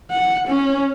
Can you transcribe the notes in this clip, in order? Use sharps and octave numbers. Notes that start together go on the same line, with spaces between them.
F#5
C#4